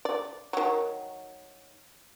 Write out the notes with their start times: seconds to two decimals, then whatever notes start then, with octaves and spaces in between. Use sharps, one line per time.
0.05 D5
0.53 D#3 F#3